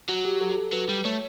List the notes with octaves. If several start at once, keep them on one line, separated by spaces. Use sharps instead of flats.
F#3 F#4
G4
A4
A4
F#3 B4
G3
A3 C#5